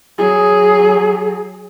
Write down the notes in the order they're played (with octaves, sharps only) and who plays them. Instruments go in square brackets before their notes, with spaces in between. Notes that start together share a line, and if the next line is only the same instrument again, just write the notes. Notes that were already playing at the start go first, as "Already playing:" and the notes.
[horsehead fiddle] F#3 G#4